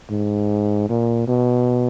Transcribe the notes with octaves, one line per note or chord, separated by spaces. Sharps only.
G#2
A#2
B2